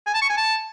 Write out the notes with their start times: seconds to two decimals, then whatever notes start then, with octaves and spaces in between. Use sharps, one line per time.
0.06 G#5
0.14 A5
0.22 C#6
0.30 G#5
0.37 A5